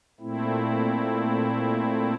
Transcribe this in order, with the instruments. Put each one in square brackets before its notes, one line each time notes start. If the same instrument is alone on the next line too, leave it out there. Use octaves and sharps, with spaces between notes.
[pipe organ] A#2 A3 C4 E4